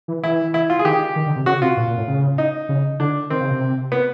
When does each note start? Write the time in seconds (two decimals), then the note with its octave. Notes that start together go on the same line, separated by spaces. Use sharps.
0.08 E3
0.23 E3 E4
0.54 E4
0.70 F4
0.79 G#4
0.85 D#3 G4
1.16 D#3
1.26 D3
1.36 C3
1.46 C#3 F#4
1.61 C3 F4
1.77 A#2
1.87 A#2
1.98 A2
2.08 C#3
2.38 D#4
2.69 C#3
3.00 D3 D4
3.30 D#3 C4
3.41 C#3
3.51 C3
3.92 B3